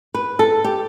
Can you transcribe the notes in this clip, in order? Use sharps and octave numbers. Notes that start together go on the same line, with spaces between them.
B4
A4
G4